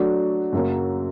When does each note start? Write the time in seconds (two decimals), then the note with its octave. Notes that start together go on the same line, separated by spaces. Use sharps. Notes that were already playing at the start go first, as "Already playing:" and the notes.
Already playing: F#3 A3 D4 F#4
0.53 F#2 C#3 F#3 A#3 C#4